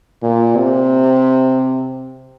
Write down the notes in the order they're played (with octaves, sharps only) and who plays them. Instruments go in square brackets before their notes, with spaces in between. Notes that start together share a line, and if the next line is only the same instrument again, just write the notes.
[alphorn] A#2
C3